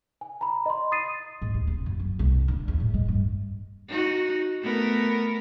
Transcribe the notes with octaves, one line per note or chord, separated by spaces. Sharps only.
G#5
A#5 B5
D#5 B5 C6
D#6 A6 C7 D#7
G#2
D#2
C#3
F#2
F#3
C2
D#3
D3
E2
A2
G#3
G2
D#4 F#4
A3 B3 A#4